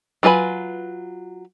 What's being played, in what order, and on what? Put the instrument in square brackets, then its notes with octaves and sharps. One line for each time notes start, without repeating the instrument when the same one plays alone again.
[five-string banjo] F#3 F4 B4 G#5 B5